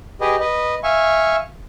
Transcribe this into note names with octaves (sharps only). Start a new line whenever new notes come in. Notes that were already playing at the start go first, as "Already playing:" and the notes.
G4 G#4 B4 D#5
B4 D#5
E5 F5 G#5 C#6